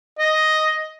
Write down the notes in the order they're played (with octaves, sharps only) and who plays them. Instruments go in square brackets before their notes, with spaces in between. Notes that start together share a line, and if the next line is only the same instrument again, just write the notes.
[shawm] D#5